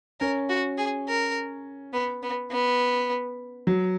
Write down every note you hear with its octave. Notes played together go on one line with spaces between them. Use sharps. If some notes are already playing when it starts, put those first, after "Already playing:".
C#4 A#4
F#4
G#4
A#4
B3
B3
B3
F#3